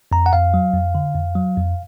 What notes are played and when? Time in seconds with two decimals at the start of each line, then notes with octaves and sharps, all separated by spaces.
0.12 F2 A#5
0.26 F#5
0.33 F2 F5
0.54 F#3
0.73 F2
0.95 D3
1.15 F2
1.35 F#3
1.57 F2